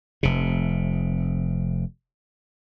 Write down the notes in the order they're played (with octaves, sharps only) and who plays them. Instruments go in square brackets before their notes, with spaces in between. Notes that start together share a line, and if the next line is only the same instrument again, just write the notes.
[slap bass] F1 C3